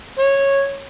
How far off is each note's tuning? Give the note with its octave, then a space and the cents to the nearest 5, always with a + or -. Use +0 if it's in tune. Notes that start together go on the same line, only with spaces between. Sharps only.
C#5 -10